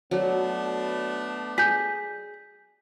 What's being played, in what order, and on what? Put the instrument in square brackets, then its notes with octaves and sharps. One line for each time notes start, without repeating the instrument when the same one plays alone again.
[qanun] F#3 [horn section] A3 B3 D4
[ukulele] G#4 [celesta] G6 B6